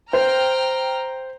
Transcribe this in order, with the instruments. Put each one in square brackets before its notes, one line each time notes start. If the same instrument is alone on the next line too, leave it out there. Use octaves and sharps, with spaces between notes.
[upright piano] C5 [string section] G5 A#5 F6